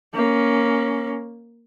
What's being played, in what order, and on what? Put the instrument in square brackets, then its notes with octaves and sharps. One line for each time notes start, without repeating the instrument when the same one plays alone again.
[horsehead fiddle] A#3 C#4